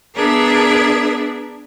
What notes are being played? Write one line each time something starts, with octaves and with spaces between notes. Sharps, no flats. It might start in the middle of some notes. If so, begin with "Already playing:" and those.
B3 D4 G#4 A#4 E5